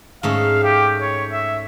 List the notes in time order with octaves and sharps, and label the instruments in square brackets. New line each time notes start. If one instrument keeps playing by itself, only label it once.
[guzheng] G#2 A3 C#4 [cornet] F5
[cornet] G4
C#5
E5